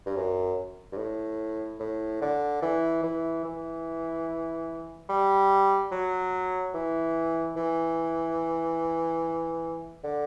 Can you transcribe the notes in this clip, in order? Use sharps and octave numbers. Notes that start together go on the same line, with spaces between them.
G2
F#2
G2
A2
A2
D3
E3
E3
E3
G3
F#3
E3
E3
D3